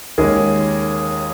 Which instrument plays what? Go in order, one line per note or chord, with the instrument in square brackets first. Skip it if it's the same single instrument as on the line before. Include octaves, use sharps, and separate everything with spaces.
[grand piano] D#2 D#3 G#3 C#4 G#4 A#4